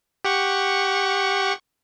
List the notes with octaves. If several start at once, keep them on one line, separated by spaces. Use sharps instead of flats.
G4 F#5 C#6